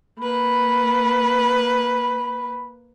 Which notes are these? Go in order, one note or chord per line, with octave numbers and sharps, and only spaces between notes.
A#3 B4 B5